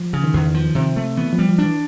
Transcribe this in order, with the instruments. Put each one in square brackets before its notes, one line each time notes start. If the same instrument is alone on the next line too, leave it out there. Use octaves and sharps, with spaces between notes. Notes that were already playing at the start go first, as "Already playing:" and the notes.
Already playing: [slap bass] F3
C#3
[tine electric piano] D#3
[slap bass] E2
F3
C3
A3
[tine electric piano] E3 [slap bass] B3
[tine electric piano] F3
[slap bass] G3
[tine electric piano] F3
[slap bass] D4
[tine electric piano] E3